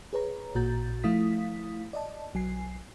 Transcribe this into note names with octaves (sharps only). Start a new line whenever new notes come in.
G#4 B4 C#5 A#5
A1 A#2 F#4 A#5 G6 A6
F3 A3 E4 F5 D#6 B6
D5 D#5 A5
B1 F#3 G#5 C7